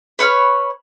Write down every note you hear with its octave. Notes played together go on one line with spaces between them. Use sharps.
B4 C#5 B5 F6